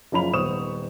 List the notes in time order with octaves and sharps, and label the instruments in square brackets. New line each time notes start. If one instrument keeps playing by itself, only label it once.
[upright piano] F#1 F3 C#4 A#5 B5 F7
D#1 B3 C5 C#6 D#6 E7